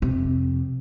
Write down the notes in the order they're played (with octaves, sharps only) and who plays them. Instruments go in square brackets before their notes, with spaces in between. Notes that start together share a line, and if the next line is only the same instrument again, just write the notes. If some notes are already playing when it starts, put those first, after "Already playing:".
[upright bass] F2 C3